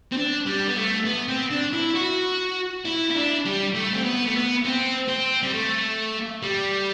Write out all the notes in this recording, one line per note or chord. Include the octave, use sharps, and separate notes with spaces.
C4
D4
G3
B3
A3
B3
C4
D4
E4
F#4
E4
E4
D4
G3
A3
C4
B3
A3
B3
C4
C4
G3
A3
G3